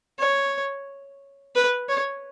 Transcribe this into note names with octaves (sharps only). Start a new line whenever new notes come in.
C#5
B4
C#5